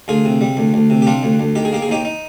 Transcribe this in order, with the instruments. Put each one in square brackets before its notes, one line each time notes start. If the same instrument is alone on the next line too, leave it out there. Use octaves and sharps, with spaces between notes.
[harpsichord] D2 F4 G#4
C3
G3
D2
D2
C3
G4
G3 D4 F4
D2
D2
D#3 G4
G#4
A#3 G4
G#4
D#2 D#4 G4
D#4